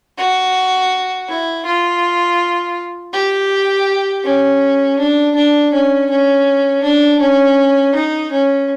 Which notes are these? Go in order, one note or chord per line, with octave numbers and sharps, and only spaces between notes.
F#4
E4
F4
G4
C#4
D4
D4
C#4
C#4
D4
C#4
D#4
C#4